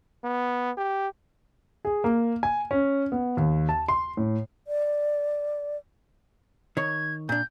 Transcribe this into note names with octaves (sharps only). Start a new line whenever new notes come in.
B3
G4
G#4
A#3
G#5
C#4
B3
D#2
A5
C6
A2
D5
D#3 C#5 G#6
A#2 D4 G6